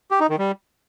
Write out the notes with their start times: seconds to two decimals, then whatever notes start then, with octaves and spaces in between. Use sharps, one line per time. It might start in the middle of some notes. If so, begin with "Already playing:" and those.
0.11 G4
0.20 D#4
0.29 D#3
0.39 G3